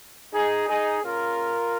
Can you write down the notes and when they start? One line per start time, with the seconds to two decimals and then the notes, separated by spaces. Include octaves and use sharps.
0.33 D#4 G#4
0.68 D#4 G#4
1.03 C#3 A#3 F4 A#4